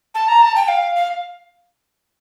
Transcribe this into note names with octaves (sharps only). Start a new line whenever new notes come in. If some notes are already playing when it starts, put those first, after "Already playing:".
A5
A#5
A5
G5
F5
F5